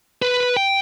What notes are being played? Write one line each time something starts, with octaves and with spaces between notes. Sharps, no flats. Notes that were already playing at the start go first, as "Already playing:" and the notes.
B4
G5